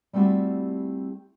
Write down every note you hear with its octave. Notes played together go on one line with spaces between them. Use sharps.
G3 A3 C4 E4 F#4 G4